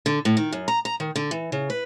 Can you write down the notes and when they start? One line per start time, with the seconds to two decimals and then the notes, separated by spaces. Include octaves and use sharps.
0.06 D3
0.25 A2
0.37 D#3
0.52 F#2
0.68 A#5
0.85 A#5
1.00 D#3
1.16 D3
1.31 E3
1.52 C#3
1.70 B4